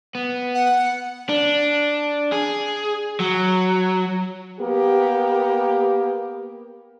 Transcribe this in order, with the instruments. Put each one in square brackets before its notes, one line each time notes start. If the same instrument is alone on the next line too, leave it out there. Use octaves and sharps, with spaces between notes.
[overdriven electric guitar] B3
[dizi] F#5
[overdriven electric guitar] D4
G#4
F#3
[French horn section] A#3 B3 G4